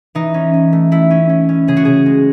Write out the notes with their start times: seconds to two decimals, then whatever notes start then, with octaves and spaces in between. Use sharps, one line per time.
0.15 E3 D#4
0.34 C#4
0.53 C#4
0.72 A3
0.91 A3 E4
1.10 C#4
1.29 C#4
1.49 C#4
1.67 C#3 G#4
1.77 F#4
1.85 C#3 G#4
2.06 G#3